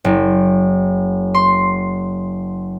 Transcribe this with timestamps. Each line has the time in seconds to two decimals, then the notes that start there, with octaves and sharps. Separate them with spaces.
0.04 F#1
1.34 C6